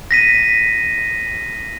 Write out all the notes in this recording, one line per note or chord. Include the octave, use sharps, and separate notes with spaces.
A#6 B6 D#7